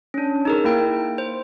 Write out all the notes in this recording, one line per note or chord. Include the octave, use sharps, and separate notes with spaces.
C#4 D4
D#4 G#4 A#4
A#3 E4 G5
C5